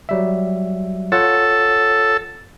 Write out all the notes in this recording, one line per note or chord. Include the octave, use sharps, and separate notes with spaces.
F#3 G3 E5
F4 A4 C#5 F#5